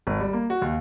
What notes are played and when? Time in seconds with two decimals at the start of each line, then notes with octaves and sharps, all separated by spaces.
0.07 G#1
0.20 G3
0.33 A#3
0.50 F#4
0.62 D#2